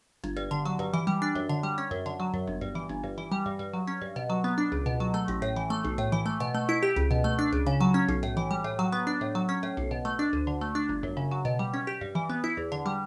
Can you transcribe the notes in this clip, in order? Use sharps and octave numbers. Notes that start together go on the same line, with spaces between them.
G1
G2
D3
F#3
G2
E3
G3
D4
F#2
D3
G3
C#4
F#2
D3
F#3
F#2
G1
G2
E3
G1
G2
E3
G3
G2
G2
F#3
C#4
G2
B2
F#3
B3
D4
C#2
B2
F#3
A3
A1
A2
E3
A3
B1
A2
E3
A3
B2
A3
E4
G4
C#2
B2
A3
D4
C#2
C#3
F#3
C#4
B1
A2
E3
G3
A2
F#3
B3
D4
A2
F#3
C#4
A2
B1
B2
A3
D4
D2
D3
A3
D4
G1
F#2
C#3
F#3
B2
G3
C#4
G4
G2
E3
B3
E4
E2
D3
G3